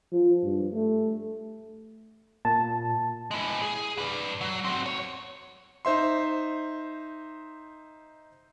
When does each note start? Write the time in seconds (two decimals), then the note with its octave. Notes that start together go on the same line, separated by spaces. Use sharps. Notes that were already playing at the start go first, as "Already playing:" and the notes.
0.12 F3
0.43 G2
0.73 A3
2.45 A#2 A5
3.31 G#3 E4
3.62 G#4
3.98 B4 D5
4.41 F#3
4.64 C4 F#4
4.86 C#5
5.85 D#4 C5 E5 C6